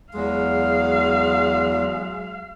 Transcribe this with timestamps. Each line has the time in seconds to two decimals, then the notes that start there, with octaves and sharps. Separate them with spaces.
0.14 E2 F#3 G#3 F5